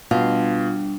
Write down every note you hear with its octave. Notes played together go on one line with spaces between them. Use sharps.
B2 G3 D4 F4